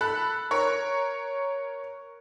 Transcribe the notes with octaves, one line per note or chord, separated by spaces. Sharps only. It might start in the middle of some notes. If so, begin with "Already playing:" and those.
A4 B5 F#6
A#4 C#5